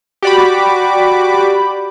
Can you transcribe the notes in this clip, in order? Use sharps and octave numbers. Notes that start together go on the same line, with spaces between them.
F#4 G4 D5 B5 D6